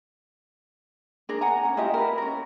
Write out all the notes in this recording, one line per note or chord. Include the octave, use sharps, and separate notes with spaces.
D4 G#4 A#4
F#5 G#5 A#5
C#4
E4 F4 G4 D#5
A#4 B4
C#4 A#4